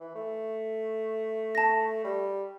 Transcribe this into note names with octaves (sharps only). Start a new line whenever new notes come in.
E3
A3
A5 A#6
G3